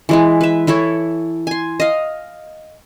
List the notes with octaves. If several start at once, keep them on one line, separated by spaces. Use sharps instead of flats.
E3 G#3 E4
B4 E5
E3 E4 A4 C#5
G#5 C6
D#5 F5